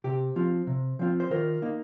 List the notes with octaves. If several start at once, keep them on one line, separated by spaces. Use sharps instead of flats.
C3 G4
F3 C4 F4
C3
F3 C4 F4
C5
D#3 F4 A#4
A#3 D#4